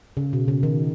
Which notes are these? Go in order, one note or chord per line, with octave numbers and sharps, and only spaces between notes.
C#3
B2
C#3
D#3